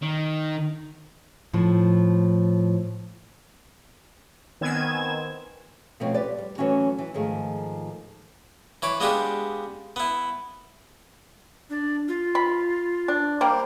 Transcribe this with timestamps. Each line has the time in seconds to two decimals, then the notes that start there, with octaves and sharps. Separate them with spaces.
0.02 D#3
1.53 A2 F3
4.61 D#3 B3 C4 G#5 G#6 E7
6.00 B2 F3 A3 C4 C#4
6.14 G4 B4 D5
6.38 G3
6.58 E3 F#3 A3 C#4 F#4
6.98 E3
7.14 G#2 D#3 F3 A3 G#4
8.82 E3 C#5 B5 D6
9.00 G#3 B3 D4 F4 G4 G#4
9.96 B3 E4
11.70 D4
12.08 F4
12.35 B5
13.08 D4
13.41 G3 A#3 C5